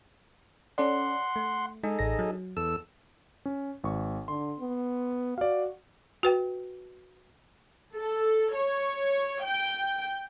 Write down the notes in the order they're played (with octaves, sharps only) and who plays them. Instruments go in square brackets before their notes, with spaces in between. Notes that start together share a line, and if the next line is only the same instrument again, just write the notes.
[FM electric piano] C#4 A4 D5 [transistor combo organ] F#5 C6
[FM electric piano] A3
[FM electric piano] G#3 [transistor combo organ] D#4 G#4 A4
[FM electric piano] A1 A#6
F#3
[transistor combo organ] E2 A4 E6
[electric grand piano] C#4
G#1 C#6
[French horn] D3 [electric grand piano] C6
[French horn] B3
[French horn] F#4 [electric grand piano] D5 F5
[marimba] F#4 B4 G5
[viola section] A4
C#5
G5